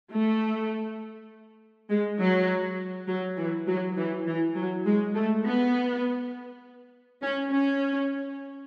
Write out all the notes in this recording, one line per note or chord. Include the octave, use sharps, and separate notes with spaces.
A3
G#3
F#3
F#3
E3
F#3
E3
E3
F#3
G#3
A3
B3
C#4
C#4